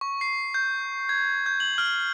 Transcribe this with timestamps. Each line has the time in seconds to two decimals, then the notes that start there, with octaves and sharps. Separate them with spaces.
0.01 C#6
0.21 C7
0.54 G6
1.09 G#6
1.46 G6
1.60 F#7
1.78 F6